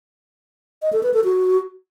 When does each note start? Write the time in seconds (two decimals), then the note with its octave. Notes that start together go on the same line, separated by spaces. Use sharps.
0.82 D#5
0.93 A4
1.03 B4
1.14 A4
1.24 F#4